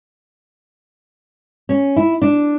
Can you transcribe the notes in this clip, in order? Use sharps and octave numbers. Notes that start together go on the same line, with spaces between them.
C#4
E4
D4